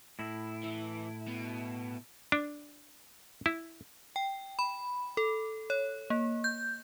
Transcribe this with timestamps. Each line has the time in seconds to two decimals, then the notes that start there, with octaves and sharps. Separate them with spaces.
0.19 A2 E4
0.63 E3
1.28 B2
2.32 D4
3.46 E4
4.16 G5
4.59 B5
5.17 A4
5.70 C#5
6.10 A#3
6.44 G6